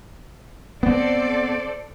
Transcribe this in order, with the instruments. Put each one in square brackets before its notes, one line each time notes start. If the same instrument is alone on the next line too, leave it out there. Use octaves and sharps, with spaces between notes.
[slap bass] B3 C4 [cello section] A4 C5 D5